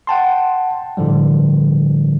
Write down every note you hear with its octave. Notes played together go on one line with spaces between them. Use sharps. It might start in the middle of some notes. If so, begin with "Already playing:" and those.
F#5 G5 A5 C6
A2 D3 F3 G3